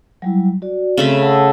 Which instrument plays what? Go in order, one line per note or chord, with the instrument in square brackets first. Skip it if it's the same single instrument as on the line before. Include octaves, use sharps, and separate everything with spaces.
[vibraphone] F#3 G3 E4
F#4 D5
[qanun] C#3 A3 B5 [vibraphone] C4
[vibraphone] F#5 A5 E6